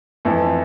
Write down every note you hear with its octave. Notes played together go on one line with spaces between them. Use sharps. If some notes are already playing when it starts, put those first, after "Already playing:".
F2 E3 A3 E4